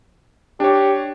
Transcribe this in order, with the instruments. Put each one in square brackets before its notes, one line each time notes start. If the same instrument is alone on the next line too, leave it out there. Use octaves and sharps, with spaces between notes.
[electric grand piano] D4 C#5 [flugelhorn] G4